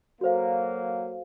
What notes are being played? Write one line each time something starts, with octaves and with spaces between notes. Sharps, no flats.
F#3 A#3 F#4 A4 C5 F5